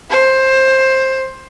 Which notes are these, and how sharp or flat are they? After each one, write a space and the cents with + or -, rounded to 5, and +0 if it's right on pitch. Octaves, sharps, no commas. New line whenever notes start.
C5 +15